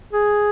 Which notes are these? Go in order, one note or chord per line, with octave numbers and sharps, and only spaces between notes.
G#4